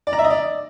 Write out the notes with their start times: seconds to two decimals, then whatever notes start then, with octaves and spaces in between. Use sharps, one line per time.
0.07 D5
0.13 A#5
0.19 E5
0.24 D#5
0.30 D5